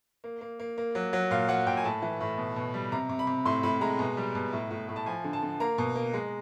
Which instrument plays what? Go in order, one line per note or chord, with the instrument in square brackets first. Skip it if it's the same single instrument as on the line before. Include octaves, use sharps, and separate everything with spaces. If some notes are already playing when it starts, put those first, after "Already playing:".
[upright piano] A#3
A#3
A#3
A#3
F#3
F#3
A#2 F5
F#3 F#5
A#2 G5
G#5
A2 A5
E3
A2
B2
B2
G3
C3 A#5
C3
B5
C3
A2 C6
A2 B5
G#3 A#5
B2
G3
B2
A2
A2
A2
A5
F3 G#5
D3
A5
D3
A#3 A#5
B2
A#3
G#3